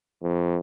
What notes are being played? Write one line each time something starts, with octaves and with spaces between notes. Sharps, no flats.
F2